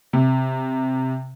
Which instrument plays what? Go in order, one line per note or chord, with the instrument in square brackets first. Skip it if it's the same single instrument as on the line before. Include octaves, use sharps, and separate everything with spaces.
[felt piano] C3